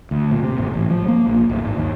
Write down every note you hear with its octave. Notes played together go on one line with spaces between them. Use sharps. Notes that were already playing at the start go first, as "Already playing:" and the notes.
D2
A#2
C3
G#1
A1
F3
A#3
A#1
D1
G#1
D#2